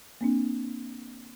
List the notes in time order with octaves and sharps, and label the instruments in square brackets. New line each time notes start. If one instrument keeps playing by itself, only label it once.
[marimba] A#3 C4 D4